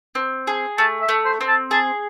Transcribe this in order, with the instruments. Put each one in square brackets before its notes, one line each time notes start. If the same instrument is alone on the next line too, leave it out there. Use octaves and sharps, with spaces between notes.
[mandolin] C4
G#4
[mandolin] A3 [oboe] A5
[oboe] E5
[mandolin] A3
[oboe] C5
[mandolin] C4
[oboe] A5
[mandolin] G#4 [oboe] A5